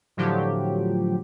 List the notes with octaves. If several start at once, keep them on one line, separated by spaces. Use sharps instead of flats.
A2 D3 F3 F#3 G4